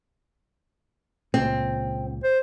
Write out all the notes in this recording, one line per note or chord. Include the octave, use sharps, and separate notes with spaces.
C#2 A#2 C4
C5